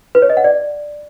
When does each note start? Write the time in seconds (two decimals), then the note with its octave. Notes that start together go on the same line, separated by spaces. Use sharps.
0.15 B4
0.22 C#5
0.30 D#5
0.37 F#5
0.44 D5